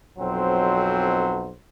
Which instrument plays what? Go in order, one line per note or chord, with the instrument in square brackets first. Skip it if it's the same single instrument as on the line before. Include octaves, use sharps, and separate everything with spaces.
[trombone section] B1 F2 F#3 C4 C5